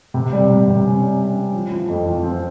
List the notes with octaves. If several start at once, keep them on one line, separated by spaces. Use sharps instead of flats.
C3
G3
C3
C3
C#4
G3
C#4
C#4
F3
F3
F2
F3
C4